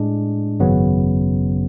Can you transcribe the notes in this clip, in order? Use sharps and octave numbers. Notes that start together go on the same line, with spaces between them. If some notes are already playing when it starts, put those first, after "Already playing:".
Already playing: A2 G#3 D4
G#1 F#2 C#3 F#3 B3